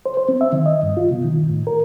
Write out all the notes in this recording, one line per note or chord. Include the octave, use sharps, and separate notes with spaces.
C5
C5
C4
E5
D#3
D#5
G2
F4
B2
D#3
A2
A#4